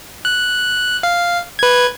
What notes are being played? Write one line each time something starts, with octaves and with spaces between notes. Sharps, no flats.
F#6
F5
B4 G#6